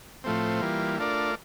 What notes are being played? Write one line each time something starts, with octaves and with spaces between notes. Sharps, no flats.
A2 F3 A3 C4
E3 G3 A#3 F4
A3 D4 F4 A#4 D5